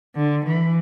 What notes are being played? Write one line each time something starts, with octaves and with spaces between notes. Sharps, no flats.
D3
E3